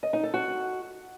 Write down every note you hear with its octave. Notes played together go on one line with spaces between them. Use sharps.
D#5
D#4
A4
F#4